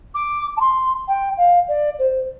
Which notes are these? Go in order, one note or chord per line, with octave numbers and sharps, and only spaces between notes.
D6
A5
C6
G5
F5
D5
C5